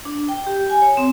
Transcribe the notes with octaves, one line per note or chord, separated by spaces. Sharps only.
D4
G5
G4
G#5
C#5
C4